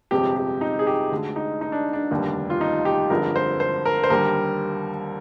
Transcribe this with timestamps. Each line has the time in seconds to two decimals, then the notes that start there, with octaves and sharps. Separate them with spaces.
0.11 G1 F2 C3 F3 G#3 G4
0.36 G4
0.61 D#4
0.79 G#4
0.87 G4
1.11 D2 D3 G#3
1.36 D#4
1.61 D#4
1.72 D4
1.93 D4
2.11 F1 D#2 D3 G3
2.50 F4
2.61 D#4
2.85 G4
3.10 G1 F2 D3 F3 G#3 A#4
3.36 C5
3.60 C5
3.85 A#4
4.04 C5
4.10 D#2 D3 G3 A#4